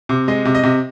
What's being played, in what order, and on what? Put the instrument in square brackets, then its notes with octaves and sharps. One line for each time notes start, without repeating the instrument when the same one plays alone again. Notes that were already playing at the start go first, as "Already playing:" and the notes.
[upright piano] C3
G#3 D#5
C3
D#5
C3